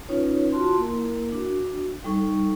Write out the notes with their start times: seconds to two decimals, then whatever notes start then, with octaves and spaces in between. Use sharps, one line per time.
0.09 C#4 D#4 F4 B4 C#5
0.52 F4 F#4 A5 C6
0.78 A#3 E4 A#4
1.32 D4 F#4
2.04 G3 D#4 A4 C#6